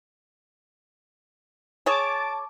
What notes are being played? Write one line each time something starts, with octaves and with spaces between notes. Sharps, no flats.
G#4 C#5 A5 D6